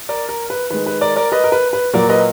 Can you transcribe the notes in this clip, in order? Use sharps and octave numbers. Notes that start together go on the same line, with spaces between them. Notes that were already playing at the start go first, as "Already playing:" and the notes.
A#4 D5
A#4
B4
D#3 G#3 B4
B4
A#4 D5
A#4 D5
B4 D#5
A#4
B4
B4
A#2 F#3 A#3 A#4 D5
B4 D#5